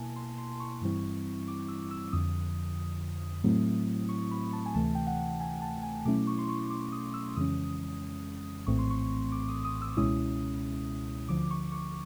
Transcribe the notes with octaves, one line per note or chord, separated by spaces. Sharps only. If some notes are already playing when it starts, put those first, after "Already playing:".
Already playing: B2 A#3 E4 G#5 A5
C6
C6
C#6
G2 E3 G3 C4 E4
D6
E6
E6
F2 D3 F3 D#6
A2 F#3 A3 C4 E4
C#6
B5
A5
G#5
D2 C3 E3 A3 A5
G5
F#5
G#5
A5
G#5
B2 F#3 A3 C#4 E4 D6
C#6
C6
C#6
D6
D#6
E6
F2 C#3 E3 G#3 C#4 D#6
A#1 A2 E3 A3 C4 C#6
C6
C#6
D6
D#6
D#6
E6
C#2 B2 G#3 C#4 E4 D#6
D2 D3 F3 D6
C#6
C#6